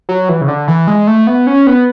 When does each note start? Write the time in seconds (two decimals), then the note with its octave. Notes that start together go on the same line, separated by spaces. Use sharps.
0.09 F#3
0.29 E3
0.41 C#3
0.48 D3
0.68 E3
0.87 G#3
1.07 A3
1.27 B3
1.47 C#4
1.67 B3